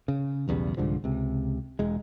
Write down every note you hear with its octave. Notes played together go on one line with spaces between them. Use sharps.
C#3
B1 E2 C#3 G3
C2 G#2 D3 F3
C#2 C3
E1 G#3